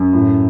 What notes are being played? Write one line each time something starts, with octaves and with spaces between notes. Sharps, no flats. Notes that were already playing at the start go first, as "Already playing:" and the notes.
Already playing: F#2
A2